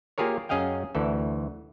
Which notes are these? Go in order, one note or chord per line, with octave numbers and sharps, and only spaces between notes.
A#3 F4 G4 G#4 A#4 C#5
F#2 C#4 G#4 D#5 F5 G5
D2 E3 A4